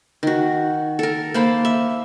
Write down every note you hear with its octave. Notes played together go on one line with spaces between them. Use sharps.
D#3 F#4
A4 A#4
A#3 C5 A5 B5
E5